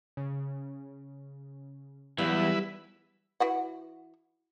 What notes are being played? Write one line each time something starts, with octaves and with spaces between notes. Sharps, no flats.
C#3
E2 F#3 G3 E4 B4 F5
E3 F#4 F#5